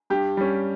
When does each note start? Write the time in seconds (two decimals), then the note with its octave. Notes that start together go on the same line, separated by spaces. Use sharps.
0.10 G2 G4
0.37 G3 C#4